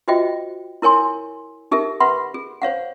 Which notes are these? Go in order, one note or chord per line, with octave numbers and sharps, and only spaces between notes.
F4 F#4 C5 D#5 E5 G5
E4 A#4 C#5 G#5 C6
D#4 G4 A4 A#4 E5
B4 E5 F#5 B5 C6
G#4
C5 C#5 F5 F#5